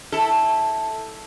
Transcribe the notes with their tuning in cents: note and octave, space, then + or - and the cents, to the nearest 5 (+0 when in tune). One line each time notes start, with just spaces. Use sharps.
E4 -15 A4 +0